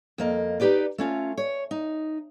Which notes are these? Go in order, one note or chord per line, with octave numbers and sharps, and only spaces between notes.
F2 A#3 D#5
D#4 F4 G4 B4 D5
A3 C#4 F4
C#5
D#4